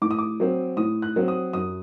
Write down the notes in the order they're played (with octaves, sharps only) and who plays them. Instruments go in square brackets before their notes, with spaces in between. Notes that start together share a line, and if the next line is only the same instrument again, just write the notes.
[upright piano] A2 D6
D#6
D6
F#3 C4
A2 D#6
F#6
F#3 C4
D#6
F#2 D#6